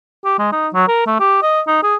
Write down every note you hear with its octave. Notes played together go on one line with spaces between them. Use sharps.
G4
G#3
D#4
F#3
A#4
A3
G4
D#5
D#4
G#4